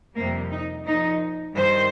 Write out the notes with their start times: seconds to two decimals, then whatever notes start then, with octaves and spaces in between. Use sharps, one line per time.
0.16 F2 C3 G3 A#3
0.51 D#4
0.85 A#2 F3 D#4
1.55 G2 D#3 G3 C5